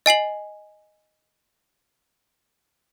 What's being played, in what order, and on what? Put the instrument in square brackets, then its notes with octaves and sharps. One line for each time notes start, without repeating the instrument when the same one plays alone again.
[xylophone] D#5 G#5 C7 F#7